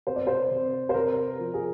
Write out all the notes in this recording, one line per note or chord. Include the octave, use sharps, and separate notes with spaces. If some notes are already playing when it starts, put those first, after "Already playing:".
C3 C5
D5
C5
C3
C5
C3 A#4
F3
G#4